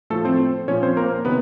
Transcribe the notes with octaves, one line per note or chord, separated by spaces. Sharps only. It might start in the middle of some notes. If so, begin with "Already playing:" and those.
A2 F3 A3 A4
C4 C5
A#2 F3 C#4 C#5
C4 C5
A#3 A#4
C3 D#3 B3 B4